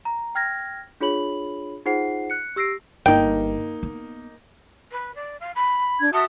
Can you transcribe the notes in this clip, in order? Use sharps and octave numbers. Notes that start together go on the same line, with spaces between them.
A#5
G5 F6 G#6 A#6
D4 F4 G#4 C#5 B5 F#7
D#4 F4 G#4 C5 F#5 C7
F#6 C#7
G4 E6 A#6 C7 D7
G1 A#3 D#4 G5
B3
B4
D5
F5
B5
D4 G#6
F#4 E5 A5 D#6